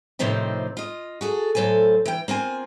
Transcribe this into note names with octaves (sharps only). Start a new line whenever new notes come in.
A2 C3 D#3 F3 C4 D#4
F4 D#5
F#4 G#4 A4
A2 F#3 A4 C5 G#5
E3 G5
A#3 C4 F4 G#5